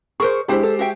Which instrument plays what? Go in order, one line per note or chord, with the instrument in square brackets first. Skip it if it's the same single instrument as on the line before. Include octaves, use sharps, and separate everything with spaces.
[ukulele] G#4 A#4 C5 [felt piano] C#6
[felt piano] G#3 G4 C5 [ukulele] D4 E4
[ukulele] A4
F#4 E5 G5